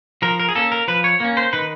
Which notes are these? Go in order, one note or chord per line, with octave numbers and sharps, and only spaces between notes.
F3 A#4
A#4
G#4
A#3 C#4 A4
A#4
F3 B4
C#5
A#3 C#4
C5
D#3 B4